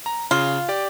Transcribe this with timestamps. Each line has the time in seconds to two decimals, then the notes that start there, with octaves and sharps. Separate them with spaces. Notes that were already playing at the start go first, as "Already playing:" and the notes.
0.06 A#5
0.31 C#3 F4
0.68 G4 D5